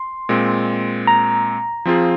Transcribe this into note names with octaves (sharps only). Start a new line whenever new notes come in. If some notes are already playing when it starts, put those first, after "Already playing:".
Already playing: C6
A#2 G#3 C4
A#5
F3 C4 F4 G#4